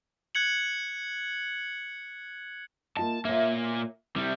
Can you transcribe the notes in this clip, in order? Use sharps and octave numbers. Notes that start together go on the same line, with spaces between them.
F#6 G#6 C#7 F#7
A#3 F4 D#5 A5
A#2 A#3 C#5 E5
C3 G3 E4